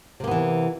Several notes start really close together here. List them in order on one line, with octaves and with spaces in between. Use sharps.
C3 A#3 B3 E3